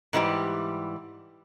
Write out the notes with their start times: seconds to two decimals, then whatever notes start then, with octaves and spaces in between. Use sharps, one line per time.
0.13 G#2 E3 G3 G4